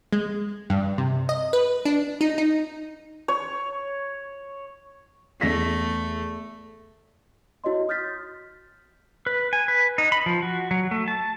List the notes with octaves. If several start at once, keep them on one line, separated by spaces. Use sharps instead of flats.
G#3
G2
C3
D#5
B4
D4
D#4
D#4
C#5
E2 A3 A#6 B6
E4 F#4 C#5 D#5 C6
D#6 F6 G6 A6 B6
B4
G#5
B4
D#4
B5
F3
F#4
F#3
A3
A5